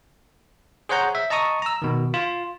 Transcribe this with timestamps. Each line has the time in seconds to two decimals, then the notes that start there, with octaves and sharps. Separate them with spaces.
0.89 G#4 C5 C#5 F#5 A#5 G6
1.15 E5
1.30 D#5 A5 A#5 C#6 D#6
1.62 A#5 E6
1.82 B2 D#3
2.14 F4